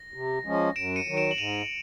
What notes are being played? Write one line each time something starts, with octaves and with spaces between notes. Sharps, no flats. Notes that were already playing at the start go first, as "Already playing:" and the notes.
Already playing: A#6
C3
F3 G#3 C#4
F#2 D7 E7
C#7 D#7
D#3 F#3
D7 E7
F#7
G#2 D#7 F7